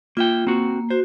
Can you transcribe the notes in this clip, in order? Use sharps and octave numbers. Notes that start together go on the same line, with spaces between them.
A#3 F4 E5 G5
A#3 C4 F#4
F#4 C5